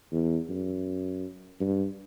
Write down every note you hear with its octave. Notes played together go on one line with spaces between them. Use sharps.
E2
F#2
G2